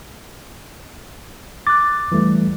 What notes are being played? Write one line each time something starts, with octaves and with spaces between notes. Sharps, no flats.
D6 F#6 A6
E3 G3 A3